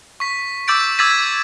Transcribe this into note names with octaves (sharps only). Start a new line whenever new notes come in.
C#6 B6
D6 E6 G6 A6 D7
D6 E6 G#6 A6 B6 D#7